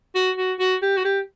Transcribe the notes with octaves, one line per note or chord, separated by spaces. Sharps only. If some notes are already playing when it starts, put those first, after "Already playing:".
F#4
F#4
F#4
G4
F#4
G4